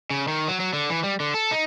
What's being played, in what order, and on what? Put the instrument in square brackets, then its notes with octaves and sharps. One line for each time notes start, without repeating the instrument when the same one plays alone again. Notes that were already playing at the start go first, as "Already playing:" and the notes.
[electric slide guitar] C#3
D#3
F#3
F#3
D3
E3
G3
D3
A4
D#4